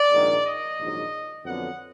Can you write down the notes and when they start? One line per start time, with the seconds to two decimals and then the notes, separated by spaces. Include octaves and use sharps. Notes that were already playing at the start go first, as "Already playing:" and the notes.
Already playing: D5
0.11 A#1 G#2 D#3
0.45 D#5
0.79 A#1 G#2 D#3 F#3
1.45 F2 D3 F#3 B3 F#5